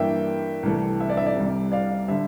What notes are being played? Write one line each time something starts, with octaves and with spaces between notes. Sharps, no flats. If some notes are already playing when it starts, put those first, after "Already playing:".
Already playing: G2 E3 A#3 D4 E5 G5
C2 C3 E3 A3
E5
D5
E5
D5
C2 C3 G3
D5 F5
D3 G3 E5